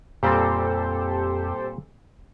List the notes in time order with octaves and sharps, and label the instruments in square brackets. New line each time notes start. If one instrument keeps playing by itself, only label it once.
[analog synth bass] F2 [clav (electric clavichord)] A#2 G3 C4 [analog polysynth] G4 A4 C5